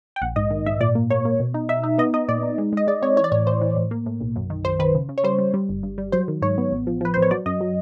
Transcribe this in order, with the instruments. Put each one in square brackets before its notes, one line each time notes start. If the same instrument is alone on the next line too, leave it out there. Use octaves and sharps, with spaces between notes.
[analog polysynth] G5
A#1 F#5
G#2 D#5
D#3
G#2 E5
A#2 D5
A#3
A#3 C#5
A#3
B2
D#4
D#4 E5
D#4
B3 D#5
D#4 D#5
A#2 D5
D#4
G#3
G#3 D#5
G#3 D5
C4 C#5
E3 C#5
D5
A2 C#5
E3 C5
E3
A2
A#3
A2
B1
F#2
D#3
F#2 C5
D#3 B4
C#3
C#3
C#5
G3 C5
G3
G3
G1
G2
G3
F#3 C5
D#3
G#2 C#5
B3
A1
F3
F3 B4
A1 C5
C#5
F#3 D5
F#2 D#5
F#3